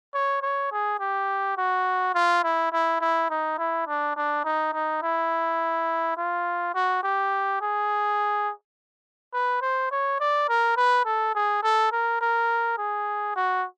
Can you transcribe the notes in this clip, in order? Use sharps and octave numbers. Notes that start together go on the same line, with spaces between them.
C#5
C#5
G#4
G4
F#4
F4
E4
E4
E4
D#4
E4
D4
D4
D#4
D#4
E4
F4
F#4
G4
G#4
B4
C5
C#5
D5
A#4
B4
A4
G#4
A4
A#4
A#4
G#4
F#4